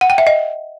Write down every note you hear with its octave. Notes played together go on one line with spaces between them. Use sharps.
F#5
G5
E5
D#5